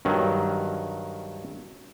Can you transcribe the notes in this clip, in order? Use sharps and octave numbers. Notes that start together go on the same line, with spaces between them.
G2 D#3 F#3